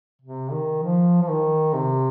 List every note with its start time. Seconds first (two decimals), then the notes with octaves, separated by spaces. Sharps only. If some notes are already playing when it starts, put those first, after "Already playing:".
0.22 C3
0.52 D#3
0.83 F3
1.22 F3
1.28 D#3
1.74 C3